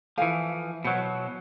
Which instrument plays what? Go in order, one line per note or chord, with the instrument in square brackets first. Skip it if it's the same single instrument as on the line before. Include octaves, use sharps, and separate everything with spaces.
[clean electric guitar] E3 F3 [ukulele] A4 F5 G#5
[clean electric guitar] B2 F#3 [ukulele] B4 C5